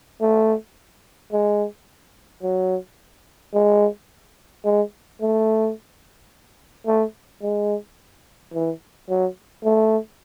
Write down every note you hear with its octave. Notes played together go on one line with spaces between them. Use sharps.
A3
G#3
F#3
G#3
G#3
A3
A3
G#3
E3
F#3
A3